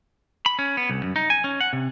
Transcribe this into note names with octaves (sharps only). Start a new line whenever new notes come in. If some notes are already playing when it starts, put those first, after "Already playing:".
B5
C#4
B3
C2
F#2
D#4
G#5
C#4
F#5
C3